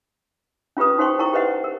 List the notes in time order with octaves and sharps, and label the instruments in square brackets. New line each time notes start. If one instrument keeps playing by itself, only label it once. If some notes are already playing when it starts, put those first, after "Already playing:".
[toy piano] C#4 F4 G4 B4 D#6
D#4 F#4 C5 G5 C6 C#6
E4 A#4 G5 A#5 C#6
G4 B4 C5 D#5 F#5 G5
A#4